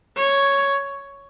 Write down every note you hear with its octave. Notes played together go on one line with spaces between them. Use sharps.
C#5